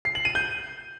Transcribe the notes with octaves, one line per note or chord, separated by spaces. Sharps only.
C7
F#7
D#7
G6